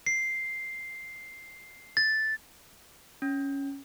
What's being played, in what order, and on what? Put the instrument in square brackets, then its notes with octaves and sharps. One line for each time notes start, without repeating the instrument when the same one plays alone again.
[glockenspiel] C7
A6
[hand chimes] C#4